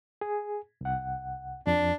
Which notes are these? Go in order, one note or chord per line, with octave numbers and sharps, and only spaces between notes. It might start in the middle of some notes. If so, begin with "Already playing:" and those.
G#4
C2 F#5
F2 D4